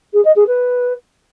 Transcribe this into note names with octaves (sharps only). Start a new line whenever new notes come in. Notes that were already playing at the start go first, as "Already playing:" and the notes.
G#4
D#5
G#4
B4